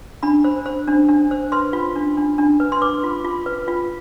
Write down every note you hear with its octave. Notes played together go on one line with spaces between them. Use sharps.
D4 B5
C5
C5
D4
D4
C5
B4 C6
F4
D4
D4
D4
B4
C6
B4 D6
F4
F4
B4
F4